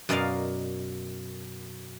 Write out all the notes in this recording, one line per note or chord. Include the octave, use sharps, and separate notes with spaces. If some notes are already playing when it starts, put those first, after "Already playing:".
F#2 B2 A#4 D5 D#5 F5